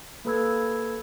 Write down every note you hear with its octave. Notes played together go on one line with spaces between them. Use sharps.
A#3 A4 B4 B5 E6 G#6